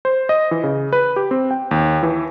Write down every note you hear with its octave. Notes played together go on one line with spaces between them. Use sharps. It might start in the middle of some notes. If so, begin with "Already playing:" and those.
C5
D#5
E3
C#3
B4
G4
C4
G5
D#2
E3